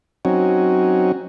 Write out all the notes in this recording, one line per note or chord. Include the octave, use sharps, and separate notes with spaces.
F#3 C4 C#4 D#4 F#4